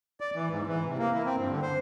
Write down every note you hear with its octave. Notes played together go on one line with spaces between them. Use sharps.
D5
E3
G#2
E3
C3
A#3
E4
C4
G2
D3
C5